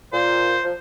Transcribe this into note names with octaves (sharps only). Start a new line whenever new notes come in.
A#2 C5
F3